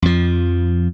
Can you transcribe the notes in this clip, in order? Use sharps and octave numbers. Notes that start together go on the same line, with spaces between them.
F2 F3